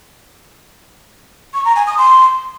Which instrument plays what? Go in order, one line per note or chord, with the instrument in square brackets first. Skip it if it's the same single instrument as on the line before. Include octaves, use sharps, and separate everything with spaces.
[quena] C#6
A#5
G#5
D#6
C6